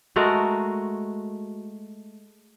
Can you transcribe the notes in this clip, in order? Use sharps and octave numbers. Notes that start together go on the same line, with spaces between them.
G#3 A3 F#4 A#4